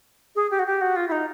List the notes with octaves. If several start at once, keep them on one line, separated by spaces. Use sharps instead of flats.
G#4
G4
F#4
G4
F#4
F4
E4
D#4